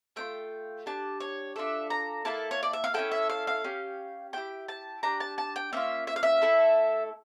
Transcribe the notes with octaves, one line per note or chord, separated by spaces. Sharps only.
A3 D4 F4 G5
D4 G4 A5
C#5
D4 F4 A4 E5
A#5
A#3 E4 A4 A5
C#5
D5
E5
F5
C#4 E4 A4 G5
E5
F5
F5
C#4 G4
C#4 E4 G4 G5
A5
D4 G4 A#5
A5
A5
G5
A#3 C#4 F4 E5
E5
F5
E5
A3 E4 A4